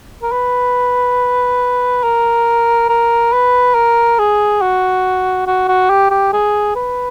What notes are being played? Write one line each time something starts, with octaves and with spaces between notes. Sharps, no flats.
A#4
B4
A#4
A#4
B4
A#4
G#4
F#4
F#4
F#4
G4
G4
G#4
B4